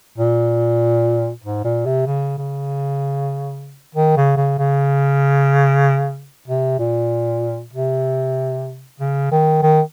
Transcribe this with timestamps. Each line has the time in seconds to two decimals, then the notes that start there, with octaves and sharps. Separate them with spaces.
0.18 A#2
1.44 G#2
1.64 A#2
1.86 C3
2.06 C#3
2.38 C#3
3.95 D#3
4.17 C#3
4.37 C#3
4.59 C#3
6.48 C3
6.79 A#2
7.73 C3
9.00 C#3
9.32 D#3
9.63 D#3